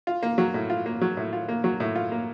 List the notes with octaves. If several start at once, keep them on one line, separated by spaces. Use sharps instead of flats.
F4
A#3
F#3
A2
F4
A#3
F#3
A2
F4
A#3
F#3
A2
F4
A#3